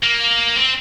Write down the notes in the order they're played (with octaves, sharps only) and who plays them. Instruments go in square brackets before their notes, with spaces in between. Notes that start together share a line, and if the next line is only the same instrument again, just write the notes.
[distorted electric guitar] A#3
C4